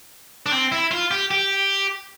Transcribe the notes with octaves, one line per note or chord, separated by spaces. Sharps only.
D4
C4
E4
F4
G4
G4